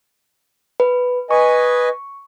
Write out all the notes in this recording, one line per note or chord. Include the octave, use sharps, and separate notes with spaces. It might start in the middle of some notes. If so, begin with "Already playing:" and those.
B4
B4 D#5 G#5 C#6